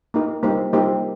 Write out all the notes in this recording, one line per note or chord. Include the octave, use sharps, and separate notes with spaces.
A#3 D#4 G4 A#4
G3 A#3 D#4 G4 C5
G3 A#3 D#4 G4 C5